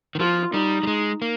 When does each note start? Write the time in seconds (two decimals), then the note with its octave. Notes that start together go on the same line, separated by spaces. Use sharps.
0.15 D#3
0.20 F3 F4
0.53 G3 D#4
0.83 G3
0.87 G#3
1.22 A#3